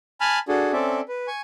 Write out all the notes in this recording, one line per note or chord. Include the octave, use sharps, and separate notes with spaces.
G#5 A5 B5 F6
D4 F#4 G#4 A4
C4 C#4 A4 D5 E5
B4
G#5 C#6